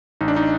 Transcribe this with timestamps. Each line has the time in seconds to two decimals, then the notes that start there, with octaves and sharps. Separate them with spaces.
0.21 A1 D#4
0.28 D4
0.36 D#4